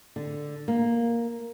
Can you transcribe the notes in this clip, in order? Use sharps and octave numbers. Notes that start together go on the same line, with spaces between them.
D3
A#3